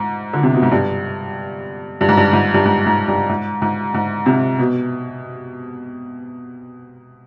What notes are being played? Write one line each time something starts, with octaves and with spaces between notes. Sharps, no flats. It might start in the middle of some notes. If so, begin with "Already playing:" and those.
Already playing: G#2
D3
C3
B2
G#2
G2
G2
G#2
G2
G#2
G2
G#2
G#2
G2
G#2
G#2
G#2
C3
B2